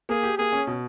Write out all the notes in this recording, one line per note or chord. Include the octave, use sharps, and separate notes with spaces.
A#3 G#4
G4
A#3 G#4
C#4
B2